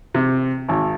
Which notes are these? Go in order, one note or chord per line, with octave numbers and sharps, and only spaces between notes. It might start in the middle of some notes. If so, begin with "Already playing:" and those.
C3
G#1